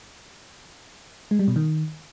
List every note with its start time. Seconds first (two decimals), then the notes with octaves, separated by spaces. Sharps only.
1.31 G#3
1.39 G3
1.48 B2
1.56 D#3